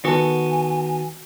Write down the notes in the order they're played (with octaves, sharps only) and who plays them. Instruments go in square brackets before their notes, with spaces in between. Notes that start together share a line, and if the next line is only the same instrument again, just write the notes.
[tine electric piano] D#3 [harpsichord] B3 A4 [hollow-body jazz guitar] F#4 [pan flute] G#5